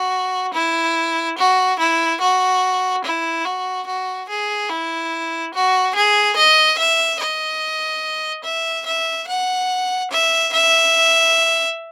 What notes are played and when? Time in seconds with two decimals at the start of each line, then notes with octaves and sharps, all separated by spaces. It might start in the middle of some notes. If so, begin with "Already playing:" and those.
Already playing: F#4
0.54 E4
1.38 F#4
1.80 E4
2.21 F#4
3.05 E4
3.45 F#4
3.87 F#4
4.29 G#4
4.70 E4
5.54 F#4
5.96 G#4
6.37 D#5
6.79 E5
7.20 D#5
8.44 E5
8.86 E5
9.28 F#5
10.11 E5
10.53 E5